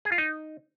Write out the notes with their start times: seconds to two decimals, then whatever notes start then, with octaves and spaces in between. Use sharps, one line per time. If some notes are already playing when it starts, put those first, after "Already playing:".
0.05 G#4
0.12 F4
0.18 D#4